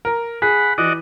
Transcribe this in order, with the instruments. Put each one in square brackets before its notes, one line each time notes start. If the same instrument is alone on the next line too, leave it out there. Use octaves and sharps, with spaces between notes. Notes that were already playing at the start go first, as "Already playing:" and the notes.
[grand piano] A#4
[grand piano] G#4 [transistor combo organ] F#5 B5
[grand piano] E3 [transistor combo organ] F#4 D5 D#5